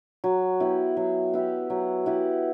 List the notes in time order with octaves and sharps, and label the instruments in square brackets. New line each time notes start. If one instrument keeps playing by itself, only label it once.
[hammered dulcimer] F#3
B3 E4 G4
F#3
B3 E4 G4
F#3
B3 E4 G4